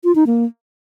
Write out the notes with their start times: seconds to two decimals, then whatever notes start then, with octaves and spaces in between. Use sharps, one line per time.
0.04 F4
0.15 D#4
0.27 A#3